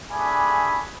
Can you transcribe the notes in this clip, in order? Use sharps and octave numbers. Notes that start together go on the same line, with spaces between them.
G3 A3 D4 G#4 G#5 B5